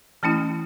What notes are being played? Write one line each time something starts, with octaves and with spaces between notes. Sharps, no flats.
E3 A3 C#4 E4 A5